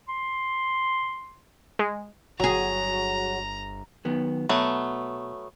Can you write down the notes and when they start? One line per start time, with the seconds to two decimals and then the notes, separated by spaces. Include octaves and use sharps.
0.09 C6
1.79 G#3
2.40 G1 F#3 F#4 G#4 A#5
4.05 D#3 F#3 B3
4.49 B2 F#3 A3 B3